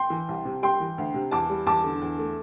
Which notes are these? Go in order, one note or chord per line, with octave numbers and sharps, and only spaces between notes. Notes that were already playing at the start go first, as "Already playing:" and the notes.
Already playing: G5 C6
E3
C2
C3
G3 G5 C6
E3
D2
C3
E2 A5 D6
G3
E2 A5 D6
D3
E2
A3